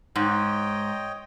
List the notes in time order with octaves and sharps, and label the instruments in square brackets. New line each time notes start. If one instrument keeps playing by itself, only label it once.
[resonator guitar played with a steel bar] G#2 [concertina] C#5 D#5 G5